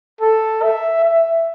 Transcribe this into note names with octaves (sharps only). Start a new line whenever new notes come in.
A4
E5
E5